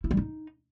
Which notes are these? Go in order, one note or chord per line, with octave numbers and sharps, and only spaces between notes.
E4
G3
D#4